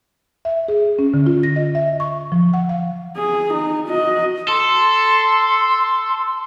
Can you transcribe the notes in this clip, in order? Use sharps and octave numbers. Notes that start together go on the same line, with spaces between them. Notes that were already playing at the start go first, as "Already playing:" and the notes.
E5
G#4
C#4
D3
F4
A#6
D#5
E5
C#6
F3
F#5
F5
G#4
D#4
F#4 D#5
A4 C6